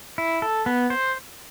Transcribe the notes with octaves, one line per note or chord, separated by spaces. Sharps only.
E4
A4
B3
C5